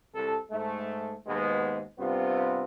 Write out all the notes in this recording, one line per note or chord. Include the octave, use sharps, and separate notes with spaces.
C2 A4
G#2 A3
D#2 G#2 B2 G#3 B3
G2 C3 B3 C4 F4